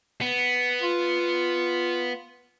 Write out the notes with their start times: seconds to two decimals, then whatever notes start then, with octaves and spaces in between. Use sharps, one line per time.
0.21 B3
0.82 F4